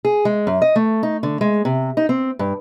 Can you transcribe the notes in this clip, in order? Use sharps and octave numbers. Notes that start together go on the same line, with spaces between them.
G#4
G#3
F#2
D#5
A3
D#4
D3
G#3
C3
D#4
C4
G2